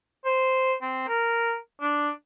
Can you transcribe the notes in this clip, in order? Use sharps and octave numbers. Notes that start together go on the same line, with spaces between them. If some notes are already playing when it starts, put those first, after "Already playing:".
C5
C4
A#4
D4